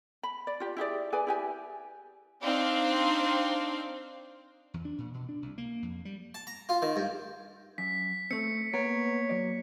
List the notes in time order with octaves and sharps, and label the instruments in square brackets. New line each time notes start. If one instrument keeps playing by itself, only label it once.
[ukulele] B5
D5
F4 G4
E4 G4 G#4 D5
G#4 B4 D5 G#5
E4 G4 G#5
[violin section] C4 D4 D#4 F5
[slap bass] E2
D4
A#2
B2
D4
C2
A#3
F2
G3
[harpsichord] A5
A#5
F4
D#3
G2
[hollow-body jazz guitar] F#2 [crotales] B6
[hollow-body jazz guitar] A3 C4 [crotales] C#7
[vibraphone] A#3 [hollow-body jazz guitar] B3 A#4 [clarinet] C#5
[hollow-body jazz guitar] F#3 D5